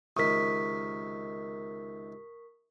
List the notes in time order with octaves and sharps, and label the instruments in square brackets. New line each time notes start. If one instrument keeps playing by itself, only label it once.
[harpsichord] C#2 C3 D#3 [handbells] A#4 D#6 [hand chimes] C#6 B6